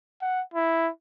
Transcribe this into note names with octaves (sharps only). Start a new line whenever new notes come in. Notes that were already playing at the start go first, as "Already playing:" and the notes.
F#5
E4